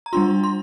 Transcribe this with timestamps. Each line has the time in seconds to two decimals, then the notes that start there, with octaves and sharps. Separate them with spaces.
0.06 A#5
0.13 G3 D4 F4 C6
0.44 C6